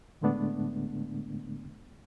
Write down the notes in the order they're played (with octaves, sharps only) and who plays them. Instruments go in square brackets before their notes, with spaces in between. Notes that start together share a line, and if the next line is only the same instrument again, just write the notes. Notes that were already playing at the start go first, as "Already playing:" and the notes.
[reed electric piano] A2 D3 G#3 A3 B3 D4